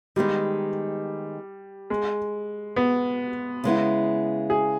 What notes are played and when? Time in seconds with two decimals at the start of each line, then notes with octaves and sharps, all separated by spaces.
0.16 D#3 G3 G#3 B3 D#4
1.90 G#3
2.76 B3
3.64 C#3 G#3 B3 E4
4.50 G#4